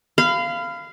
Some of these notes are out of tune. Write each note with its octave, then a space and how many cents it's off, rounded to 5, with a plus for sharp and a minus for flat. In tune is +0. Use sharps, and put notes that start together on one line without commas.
F5 -15 B5 +30